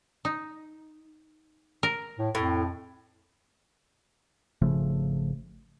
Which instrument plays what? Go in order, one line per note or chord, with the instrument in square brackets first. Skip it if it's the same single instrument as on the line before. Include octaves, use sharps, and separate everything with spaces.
[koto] D#4
A#4
[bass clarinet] A2
[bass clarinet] F2 [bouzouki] A2
[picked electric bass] G#1 C#3 F3 A3